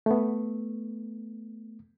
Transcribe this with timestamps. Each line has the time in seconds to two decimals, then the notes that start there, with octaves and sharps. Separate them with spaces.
0.06 A3 B3